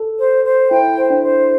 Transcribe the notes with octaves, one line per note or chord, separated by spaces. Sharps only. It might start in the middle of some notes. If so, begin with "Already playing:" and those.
Already playing: A4
C5
C5
E4 G5
C5
D4
C5